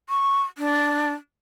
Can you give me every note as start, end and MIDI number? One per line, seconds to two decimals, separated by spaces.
0.09 0.42 85
0.58 1.13 62